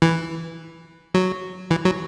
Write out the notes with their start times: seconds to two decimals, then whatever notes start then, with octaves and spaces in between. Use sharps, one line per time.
0.02 E3
1.14 F#3
1.71 E3
1.85 F#3